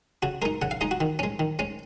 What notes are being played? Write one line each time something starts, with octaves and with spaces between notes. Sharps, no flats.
C#3 F#4
G#3 D#4 A#4
C#3 F#5
F5
G#3 D#4 D#5
F#4
D#3
G#3 C#4
D#3
G#3 C#4